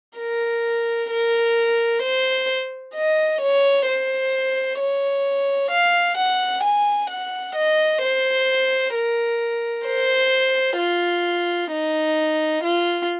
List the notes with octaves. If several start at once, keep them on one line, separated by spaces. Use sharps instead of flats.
A#4
A#4
C5
D#5
C#5
C5
C#5
F5
F#5
G#5
F#5
D#5
C5
A#4
C5
F4
D#4
F4